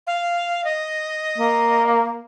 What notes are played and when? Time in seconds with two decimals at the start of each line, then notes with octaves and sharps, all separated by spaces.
0.07 F5
0.64 D#5
1.38 A#3